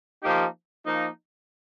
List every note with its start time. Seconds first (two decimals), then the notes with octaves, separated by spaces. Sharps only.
0.22 F3 A#3 D#4 G4
0.85 F3 A#3 D#4